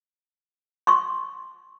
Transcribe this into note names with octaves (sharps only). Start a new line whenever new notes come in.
C6 C#6